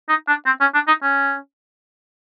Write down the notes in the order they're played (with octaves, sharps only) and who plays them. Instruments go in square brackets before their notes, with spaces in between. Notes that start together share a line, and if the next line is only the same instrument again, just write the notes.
[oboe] D#4
D4
C4
C#4
D4
D#4
C#4